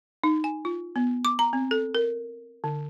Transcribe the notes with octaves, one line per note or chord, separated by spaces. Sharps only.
D#4
G#5
F4
B3
D6
A#5
C4
A4
A#4
D3